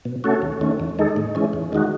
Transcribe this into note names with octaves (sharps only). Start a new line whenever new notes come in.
B2
A3 C#4 F#4 A4
D#2
D#3 A3 C#4
E2
D#3 G#3 D#4 A4
A2
E3 G#3 C#4
E2
D#3 G#3 D#4 F#4